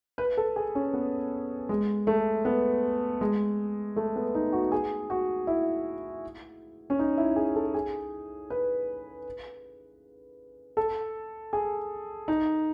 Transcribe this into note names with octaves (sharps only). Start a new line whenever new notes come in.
B4
A4
G#4
C#4
B3
G#3
A3
B3
G#3
A3
B3
D#4
F#4
G#4
F#4
E4
C#4
D#4
E4
G#4
A4
G#4
B4
A4
G#4
D#4